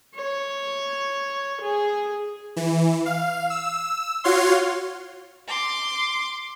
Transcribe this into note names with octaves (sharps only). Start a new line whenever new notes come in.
C#5
G#4
E3
F5
E6
F4 F#4 C#5 F5 C6
C6 D6